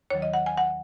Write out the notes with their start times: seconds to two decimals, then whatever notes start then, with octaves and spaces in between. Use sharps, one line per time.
0.10 D#2 D#3 F#3 C#5
0.22 D#5
0.34 F#5
0.46 G#5
0.58 F#5